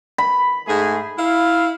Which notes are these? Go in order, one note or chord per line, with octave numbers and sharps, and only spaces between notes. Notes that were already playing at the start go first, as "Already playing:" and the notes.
B5
G#2 A3 G#4
E4 F5